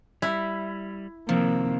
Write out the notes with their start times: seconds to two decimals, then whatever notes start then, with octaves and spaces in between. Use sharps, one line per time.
0.22 G3 E4
1.29 C3 D#3 F3 A#3 C4